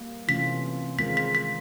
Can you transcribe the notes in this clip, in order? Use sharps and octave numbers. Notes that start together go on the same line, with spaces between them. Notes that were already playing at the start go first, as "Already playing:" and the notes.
Already playing: G3 A#3
C3 E3 A3 C#4 F4 B6
D#3 G#3 C4 F4 A#4 B6
B6
B6